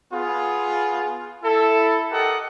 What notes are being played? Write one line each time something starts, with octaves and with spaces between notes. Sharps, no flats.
B3 F4 G#4
E4 A4
G4 A4 A#4 D#5 F#5